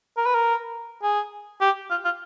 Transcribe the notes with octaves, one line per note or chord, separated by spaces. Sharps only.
A#4
B4
A#4
G#4
G4
F4
F4